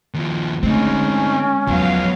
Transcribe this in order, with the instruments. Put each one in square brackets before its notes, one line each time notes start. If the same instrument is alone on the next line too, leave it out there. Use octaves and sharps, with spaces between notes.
[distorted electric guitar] D#2 F3
[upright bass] D3 A3 [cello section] G#3 [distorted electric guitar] C4 D#4 [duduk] C#4
[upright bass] E2 [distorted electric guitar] F3 B3 [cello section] F#3 F5